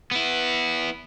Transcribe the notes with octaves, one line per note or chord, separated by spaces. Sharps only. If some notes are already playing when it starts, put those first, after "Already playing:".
B3 E4